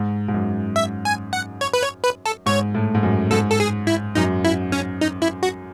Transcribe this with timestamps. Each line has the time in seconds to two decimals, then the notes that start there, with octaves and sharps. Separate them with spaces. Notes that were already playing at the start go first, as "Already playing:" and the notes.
Already playing: G#2
0.28 G#2
0.34 F#2
0.76 E5
1.05 G#5
1.33 F#5
1.61 C#5
1.74 B4
1.83 C#5
2.04 B4
2.26 A4
2.46 G#2 C#5
2.75 A2
2.95 G#2
3.03 F#2
3.31 G#2 A4
3.51 A4
3.60 G#4
3.87 E4
4.15 F#2 D#4
4.44 E4
4.72 C#4
5.01 D#4
5.22 E4
5.43 F#4